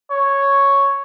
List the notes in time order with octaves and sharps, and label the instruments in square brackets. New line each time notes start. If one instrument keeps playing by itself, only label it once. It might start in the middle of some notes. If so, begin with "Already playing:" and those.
[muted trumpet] C#5